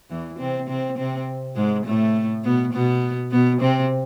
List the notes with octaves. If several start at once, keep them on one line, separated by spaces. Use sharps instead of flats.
E2 E3
C3 C4
C3 C4
C3 C4
G#2 G#3
A2 A3
B2 B3
B2 B3
B2 B3
C3 C4